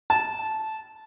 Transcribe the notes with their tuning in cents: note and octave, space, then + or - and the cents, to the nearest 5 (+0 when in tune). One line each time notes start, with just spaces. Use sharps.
A5 -10